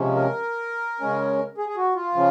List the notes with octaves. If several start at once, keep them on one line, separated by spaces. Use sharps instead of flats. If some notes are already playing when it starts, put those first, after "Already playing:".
Already playing: C3 F3 G#3 C#4
A#4
C#3 G#3 C#4
G#4
G#4
F#4
F4
C#3 F3